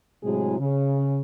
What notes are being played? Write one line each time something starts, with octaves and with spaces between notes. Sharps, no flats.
A2 C3 F#3 G#3 E4 G#4
C#3